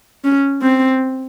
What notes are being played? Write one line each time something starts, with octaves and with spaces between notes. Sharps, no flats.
C#4
C4